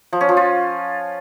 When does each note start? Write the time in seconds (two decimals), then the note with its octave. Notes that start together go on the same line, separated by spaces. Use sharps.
0.13 F3
0.21 C#4
0.29 F3
0.37 F4